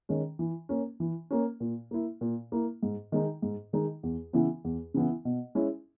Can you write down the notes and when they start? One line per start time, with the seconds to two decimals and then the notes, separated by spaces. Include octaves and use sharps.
0.09 D#3 G#3 C#4
0.39 E3
0.69 A#3 C#4
1.00 E3
1.31 A#3 C#4
1.60 A#2
1.91 A#3 E4
2.21 A#2
2.52 A#3 E4
2.83 G#2
3.12 D#3 G#3 D#4
3.42 G#2
3.73 D#3 G#3 D#4
4.03 E2
4.33 C#3 E3 B3 E4
4.64 E2
4.94 C#3 E3 B3 E4
5.25 B2
5.55 G#3 C#4 E4